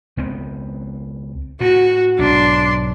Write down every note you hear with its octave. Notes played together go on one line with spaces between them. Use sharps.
C#2 B3 C4
A2 F#4
B1 G#2 D4 C6